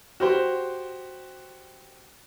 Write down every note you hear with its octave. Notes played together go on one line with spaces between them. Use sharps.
F#4 G4 C5